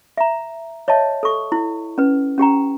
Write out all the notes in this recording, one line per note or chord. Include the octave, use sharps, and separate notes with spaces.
E5 A#5
C#5 D#5 E5 A5
A4 C#6
E4
C#4 B4
C#4 G4 G5 A#5